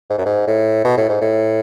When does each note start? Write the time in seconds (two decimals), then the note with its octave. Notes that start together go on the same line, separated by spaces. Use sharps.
0.10 G#2
0.18 F#2
0.25 G#2
0.47 A2
0.84 B2
0.97 A2
1.09 G#2
1.21 A2